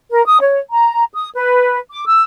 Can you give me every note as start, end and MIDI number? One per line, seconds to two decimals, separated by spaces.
0.10 0.25 70
0.25 0.37 87
0.41 0.58 73
0.70 1.03 82
1.13 1.28 87
1.34 1.77 71
1.91 2.04 86
2.06 2.21 88